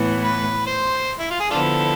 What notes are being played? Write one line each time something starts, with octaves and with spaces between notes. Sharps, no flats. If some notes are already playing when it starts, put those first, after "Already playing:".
Already playing: A2 E3 B3
B4
C5
E4
F4
G#4
D3 F3 B3 D4 E4 F4 A4